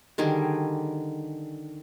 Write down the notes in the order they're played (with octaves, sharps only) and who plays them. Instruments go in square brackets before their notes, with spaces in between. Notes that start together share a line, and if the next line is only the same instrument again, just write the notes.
[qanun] D3 D#3 G3 G#4